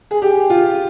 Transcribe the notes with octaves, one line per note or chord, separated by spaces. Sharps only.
G#4
G4
F4